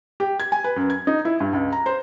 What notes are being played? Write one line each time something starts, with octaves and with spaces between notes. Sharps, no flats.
G4
G#6
G#5
B4
F#2
G#6
D#4
E4
G2
C#2
A#5
C5